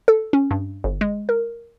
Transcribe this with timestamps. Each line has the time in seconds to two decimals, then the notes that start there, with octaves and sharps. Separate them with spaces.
0.08 A4
0.33 C#4
0.51 G2
0.84 G1
1.01 G#3
1.29 A#4